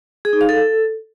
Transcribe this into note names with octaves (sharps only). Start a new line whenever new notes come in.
G#4
D#4
F5
A4